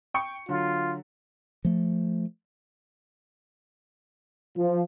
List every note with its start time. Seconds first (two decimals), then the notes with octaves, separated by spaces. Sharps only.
0.14 G5 C#6 C#7
0.49 D3 F#3 F4
1.65 F3 A3
4.57 F3